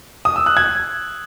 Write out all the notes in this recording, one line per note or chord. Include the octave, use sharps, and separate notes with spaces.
D#6
E6
F#6
G#6